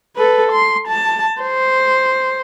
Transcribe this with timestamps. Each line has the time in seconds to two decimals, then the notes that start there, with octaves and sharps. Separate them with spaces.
0.16 A4 B4
0.52 C6
0.88 A5
1.42 C5